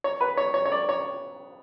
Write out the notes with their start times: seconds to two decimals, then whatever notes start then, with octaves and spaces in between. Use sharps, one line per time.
0.04 C#5
0.21 B4
0.37 C#5
0.54 C#5
0.66 C#5
0.72 D5
0.89 C#5